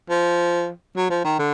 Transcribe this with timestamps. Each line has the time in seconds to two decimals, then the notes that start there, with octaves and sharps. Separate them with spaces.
0.10 F3
0.96 F#3
1.10 F3
1.24 D#3
1.39 D3